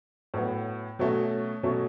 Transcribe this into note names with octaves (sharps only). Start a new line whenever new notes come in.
A2 F#3 B3
B2 F#3 A3 C#4
B2 F#3 A3 C#4